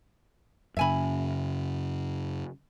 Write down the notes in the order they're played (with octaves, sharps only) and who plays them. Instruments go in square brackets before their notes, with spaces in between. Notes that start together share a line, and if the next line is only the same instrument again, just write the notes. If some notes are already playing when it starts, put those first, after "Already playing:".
[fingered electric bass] F#2 C#3 [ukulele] E5 G#5 B5